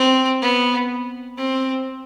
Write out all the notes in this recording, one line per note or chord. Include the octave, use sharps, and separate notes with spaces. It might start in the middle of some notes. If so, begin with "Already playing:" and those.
Already playing: C4
B3
C4